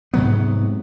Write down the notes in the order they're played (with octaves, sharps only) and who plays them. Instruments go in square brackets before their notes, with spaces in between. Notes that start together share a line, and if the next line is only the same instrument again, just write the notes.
[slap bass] G#2 C3 F#3 B3